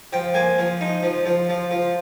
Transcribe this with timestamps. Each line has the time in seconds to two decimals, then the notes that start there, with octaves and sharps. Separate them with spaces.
0.13 F3 G5
0.34 A#3 G#5
0.58 F3
0.81 D#4
1.03 F3
1.25 F3
1.49 F3
1.71 F3